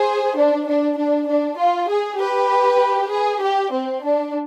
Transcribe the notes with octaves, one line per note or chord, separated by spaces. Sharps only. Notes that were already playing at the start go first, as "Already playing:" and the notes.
Already playing: G#4 C5
D4
D4
D4
D4
F4
G#4
G4 B4
G#4
G4
C4
D4